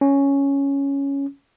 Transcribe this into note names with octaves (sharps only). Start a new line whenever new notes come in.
C#4